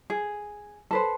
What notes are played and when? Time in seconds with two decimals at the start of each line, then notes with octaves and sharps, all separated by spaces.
0.10 G#4
0.91 A4 B4 C5